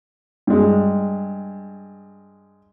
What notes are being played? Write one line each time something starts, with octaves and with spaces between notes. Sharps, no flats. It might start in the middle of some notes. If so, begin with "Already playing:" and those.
G2 G#3